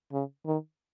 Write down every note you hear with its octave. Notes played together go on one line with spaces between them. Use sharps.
C#3
D#3